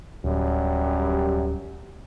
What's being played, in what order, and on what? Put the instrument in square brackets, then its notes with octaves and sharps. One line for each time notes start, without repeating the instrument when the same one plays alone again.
[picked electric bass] D1 [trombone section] F#2 G3